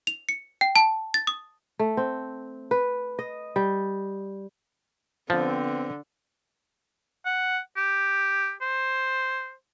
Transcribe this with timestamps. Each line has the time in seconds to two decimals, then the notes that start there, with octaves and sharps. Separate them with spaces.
0.07 F7
0.29 C#7
0.61 G5
0.76 A5
1.14 A6
1.27 D#6
1.79 A3
1.97 C4
2.71 B4
3.19 D#5
3.56 G3
5.30 D3 F3 B3 C4
7.26 F#5
7.77 G4
8.61 C5